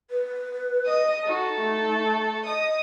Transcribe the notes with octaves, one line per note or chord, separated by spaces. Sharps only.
B4
D#5 D#6
D#4 F#4 A4
A3
D#5 D#6